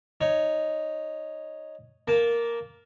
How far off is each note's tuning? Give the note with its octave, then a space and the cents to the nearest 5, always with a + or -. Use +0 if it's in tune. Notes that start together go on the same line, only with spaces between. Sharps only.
D#4 +0 C#5 +0
A#3 +0 A5 -20